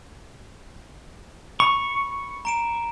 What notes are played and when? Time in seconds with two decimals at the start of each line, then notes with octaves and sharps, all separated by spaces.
1.60 B5 C#6
2.45 A#5 D7 E7